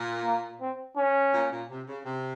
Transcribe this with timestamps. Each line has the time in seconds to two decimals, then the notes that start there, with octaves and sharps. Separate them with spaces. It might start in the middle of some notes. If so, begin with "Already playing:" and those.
Already playing: A#2
0.25 A#3
0.61 C4
0.97 C#4
1.34 A#2
1.50 A#2
1.69 C3
1.87 C#3
2.05 C3